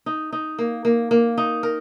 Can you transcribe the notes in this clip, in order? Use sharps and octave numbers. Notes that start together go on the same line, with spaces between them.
D#4
D#4
A#3
A#3
A#3
D#4
A#4